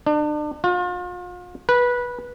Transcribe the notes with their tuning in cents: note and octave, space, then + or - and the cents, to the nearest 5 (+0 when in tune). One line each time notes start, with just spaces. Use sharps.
D4 +35
F4 +40
B4 -15